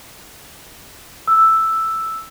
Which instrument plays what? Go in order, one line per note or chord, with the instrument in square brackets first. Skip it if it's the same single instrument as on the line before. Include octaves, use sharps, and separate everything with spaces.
[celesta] E6